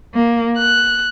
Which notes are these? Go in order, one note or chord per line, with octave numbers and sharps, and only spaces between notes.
A#3
F#6